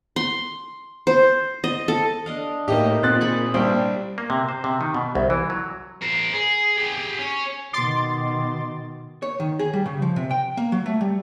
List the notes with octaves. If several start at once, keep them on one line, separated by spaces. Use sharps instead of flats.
C6
C5
D#5
A4
D4 D#5 F5
A2 A#3 D#4 G4 D#5
A#2 C4 F#6 A6
G#4 B5 C#6
C2 G3 D4 C5 G5
A#3
C3
C5
C3
D#3
B2
C2
E3
F#3
A#4 C5
G#4
G4 G#4
C#4
B2 D#3 C6 D6 A6
C#5
D#3
G#4
G3
C#3
F3
C3
G5
A#3
F#3
A3
G3